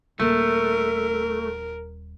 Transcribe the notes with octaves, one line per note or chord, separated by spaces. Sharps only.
D#1 A3 A#4